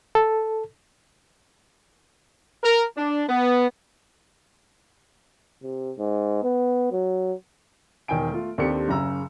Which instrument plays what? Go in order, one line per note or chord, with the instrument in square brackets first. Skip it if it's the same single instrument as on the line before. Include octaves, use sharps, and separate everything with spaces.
[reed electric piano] A4
[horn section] A#4
D4
B3
[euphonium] C3
G#2
B3
F#3
[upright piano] E1 D#3 G5 G#5 D7
A3 F4
D#2 C4 D4 G4 A4 C#7
F#1 C#3 A#5 E6